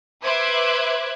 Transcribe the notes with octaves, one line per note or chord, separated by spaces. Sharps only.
B4 C5 E5 D6 F#6 G#6